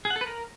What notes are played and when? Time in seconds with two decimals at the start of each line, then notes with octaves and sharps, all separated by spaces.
0.05 G#4
0.10 F#5
0.16 A4
0.21 B4
0.27 A#4